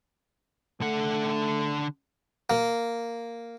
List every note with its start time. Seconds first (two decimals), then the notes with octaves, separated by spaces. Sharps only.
0.81 D3 A3 F#5
2.50 A#3